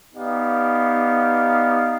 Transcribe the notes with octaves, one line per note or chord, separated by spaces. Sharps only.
B3 D#4 G4 D5 F5